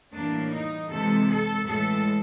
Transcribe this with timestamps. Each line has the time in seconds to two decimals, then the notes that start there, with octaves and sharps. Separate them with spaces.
0.13 A2 E3 G3 A#3 D4
0.51 D#4
0.90 C3 E3 G#3 A4
1.29 A4
1.66 A2 E3 G#3 A4